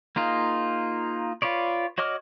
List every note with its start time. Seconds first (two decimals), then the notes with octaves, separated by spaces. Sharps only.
0.16 A#3 D#4 F4 G#4
1.42 F4 B4 C#5 D5
1.98 F#4 C#5 D#5 D6 F6